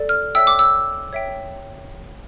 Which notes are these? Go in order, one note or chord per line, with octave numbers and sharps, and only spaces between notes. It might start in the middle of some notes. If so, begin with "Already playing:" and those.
Already playing: A4 D5
F6
C#5 E5 G5 E6
D6
E6
C#5 E5 G5